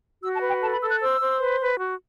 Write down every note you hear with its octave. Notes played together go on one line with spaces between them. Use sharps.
F#4 E6
A5
B4
G5
A4 A5
B5
A4 E6
F#6
C5 E6
C5
B4
B4
F#4